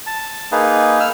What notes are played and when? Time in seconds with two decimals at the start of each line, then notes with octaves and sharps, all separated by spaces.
0.06 A5
0.52 A#3 D#4 G#4 B4
1.00 E6 F6